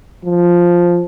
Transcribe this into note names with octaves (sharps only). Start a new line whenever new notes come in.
F3